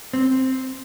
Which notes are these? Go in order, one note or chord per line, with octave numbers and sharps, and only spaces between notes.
C4